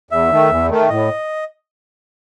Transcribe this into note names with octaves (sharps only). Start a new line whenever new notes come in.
E2 E5
D#3 A3
E2
D#3 A3
A2 D#5